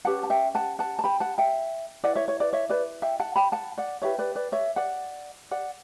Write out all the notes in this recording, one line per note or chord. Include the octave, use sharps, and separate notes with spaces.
C#4 G4 B4 F#5 A5
A5
E5 G5
F#5 A5
F#5 A5
A5
G5 B5
F#5 A5
E5 G5
E4 B4 D5 F#5
C#5 E5
C#5
B4 D5
C#5 E5
B4 D5
E5 G5
F#5 A5
G5 B5
F#5 A5
D5 F#5
E4 G4 B4 C#5 E5
B4 D5
B4 D5
C#5 E5
D5 F#5
D5 F#5